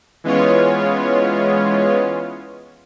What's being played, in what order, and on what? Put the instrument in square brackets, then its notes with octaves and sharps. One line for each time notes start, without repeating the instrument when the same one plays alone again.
[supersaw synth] E3 G#3 B3 C#4 F4 C#5